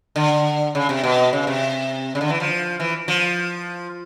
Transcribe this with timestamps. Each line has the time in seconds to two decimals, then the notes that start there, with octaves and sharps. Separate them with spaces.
0.16 D3
0.75 C#3
0.89 C3
1.03 B2
1.33 C#3
1.47 C3
2.15 C#3
2.21 D3
2.30 E3
2.40 F3
2.80 E3
3.08 F3